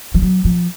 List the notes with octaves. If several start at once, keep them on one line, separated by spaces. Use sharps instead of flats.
F3
F#3
F3